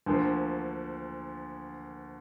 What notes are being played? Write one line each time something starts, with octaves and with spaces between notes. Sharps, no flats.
D2 D3 F3 A#3